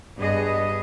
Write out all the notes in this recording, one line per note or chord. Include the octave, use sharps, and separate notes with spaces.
G2 B3 G#4 D#5